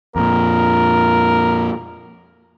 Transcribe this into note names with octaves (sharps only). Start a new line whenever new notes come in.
F2 A#2 A#4